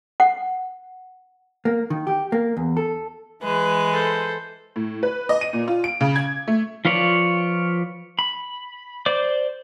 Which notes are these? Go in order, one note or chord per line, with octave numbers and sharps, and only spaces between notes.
F#5
A#3
D#3
G4
A#3
E2
A4
E3 G#3 B4
A4 C5
A2
B4
D#5
D#7
A#2
F4
D7
C#3
G#6
A3
F3 F4 B4 C#5 D5
B5
C5 D5 D6